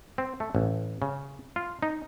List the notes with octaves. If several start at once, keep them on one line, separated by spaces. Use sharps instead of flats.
C4
A3
A1
C#3
F4
D#4